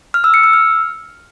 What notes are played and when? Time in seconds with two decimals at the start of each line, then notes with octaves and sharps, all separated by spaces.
0.14 F6
0.24 E6
0.34 C#7
0.44 E6
0.53 F6